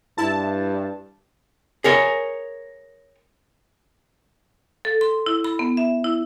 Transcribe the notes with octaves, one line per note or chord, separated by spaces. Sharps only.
G2 E4 A5
G#4 A#4 C#5
A4
C6
E4
B5
B3
E5
E4